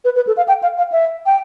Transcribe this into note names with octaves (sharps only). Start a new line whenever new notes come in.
B4
B4
A4
F5
G5
F5
F5
E5
G5